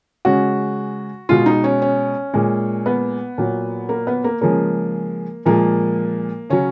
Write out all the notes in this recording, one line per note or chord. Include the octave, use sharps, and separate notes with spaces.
C#3 G#3 F#4
B2 G#3 F4
D#4
C#4
C#4
A#2 G#3
B3
A#2 F#3
A#3
B3
A#3
C#3 F3 G#3 A#3
A#2 F3 G#3 A#3
C#3 F#3 C#4